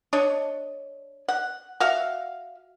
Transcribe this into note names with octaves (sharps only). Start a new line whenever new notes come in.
D4 C#5 D#5
F#5
F#4 E5 F5